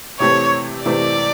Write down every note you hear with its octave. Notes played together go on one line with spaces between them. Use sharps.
C3 E3 A3 C4 C#5
C3 E3 A3 C4 D5